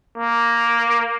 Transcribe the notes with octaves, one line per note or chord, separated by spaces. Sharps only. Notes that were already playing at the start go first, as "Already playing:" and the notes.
A#3